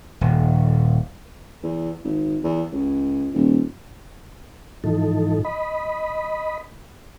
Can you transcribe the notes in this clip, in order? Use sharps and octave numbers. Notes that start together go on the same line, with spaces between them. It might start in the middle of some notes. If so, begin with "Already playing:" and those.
D#1
E2
G#1
E2
C#2
D#1
G#2 E3 F3 D#4 A4
D#5 B5